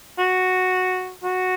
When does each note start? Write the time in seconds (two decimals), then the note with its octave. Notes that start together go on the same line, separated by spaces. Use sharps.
0.19 F#4
1.24 F#4